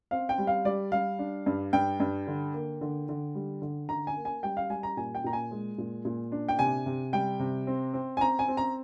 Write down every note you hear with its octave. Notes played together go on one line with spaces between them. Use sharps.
C4 F5
G5
G3
F5
G3 D5
G3 F5
D4
G2
G2 G5
G2
D3
A#3
D3
D3
G3
D3
D3 A#5
G#5
A#3
G#5
G3 G5
F5
G3 G#5
A#5
A#2 G#5
G5
A#2 A#5
G#5
G#3
A#2
A#2
D4
G5
C3 G#5
C3
G3 G5
C3
C4
C4
G#5
C4 A#5
G#5
C4
A#5